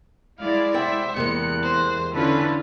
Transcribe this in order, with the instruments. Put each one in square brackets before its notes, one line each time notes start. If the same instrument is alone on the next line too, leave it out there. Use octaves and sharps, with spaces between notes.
[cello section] G#3 E4 D5 [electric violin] F5
[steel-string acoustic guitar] C3 F#5 G5 [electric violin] C5 E5
[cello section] E2 [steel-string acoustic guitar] C3 G#3 A#3 [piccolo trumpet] F#6 [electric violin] C#7
[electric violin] C5
[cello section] D3 C#4 B4 [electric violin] E4 F4 [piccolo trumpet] A4